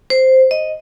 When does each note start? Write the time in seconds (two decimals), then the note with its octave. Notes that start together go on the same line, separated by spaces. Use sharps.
0.10 C5
0.51 D#5